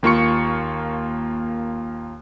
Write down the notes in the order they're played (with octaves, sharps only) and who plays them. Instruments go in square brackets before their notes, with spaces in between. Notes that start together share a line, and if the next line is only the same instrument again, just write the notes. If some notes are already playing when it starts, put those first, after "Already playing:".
[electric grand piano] D#2 A#3 F4 C#6 C#7